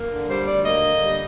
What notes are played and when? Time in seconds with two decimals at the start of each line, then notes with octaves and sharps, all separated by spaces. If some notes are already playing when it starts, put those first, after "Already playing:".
Already playing: A#3
0.11 D3
0.29 G3 C5
0.47 D2 D5
0.65 A#3 D#5
0.83 D3
1.01 G3